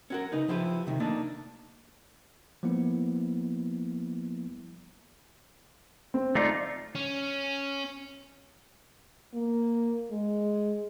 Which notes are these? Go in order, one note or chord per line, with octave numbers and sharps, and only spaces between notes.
C#4 F#4 A#4
C#3 D#4 B4
F3 E4 F4 G4 B4
C3 D#3
A3 A#3 D4 D#4 D5 A5
F3 G3 A#3 B3 E4
C4
A3 D#4 F4 D5
C#4
A#3
G#3